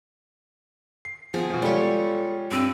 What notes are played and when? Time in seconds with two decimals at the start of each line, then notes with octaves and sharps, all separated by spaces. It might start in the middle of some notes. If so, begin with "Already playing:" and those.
1.05 C7
1.34 F3 B3 G#4
1.50 B2 F3
1.62 G3 G#3 F4 A4 C#5
2.51 G2 C4 E6 D#7